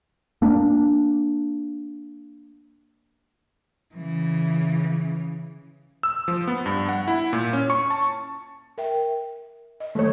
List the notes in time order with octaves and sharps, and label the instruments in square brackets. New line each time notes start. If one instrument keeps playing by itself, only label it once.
[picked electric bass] A#3 D4
[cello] C#3 E3
[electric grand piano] E6
F3
B3
G2
F#5
E4
A#2
C#4
C#6
A5
[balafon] A#4 E5 G5
D#5
[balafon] D#3 F#3 [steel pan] A3 C#5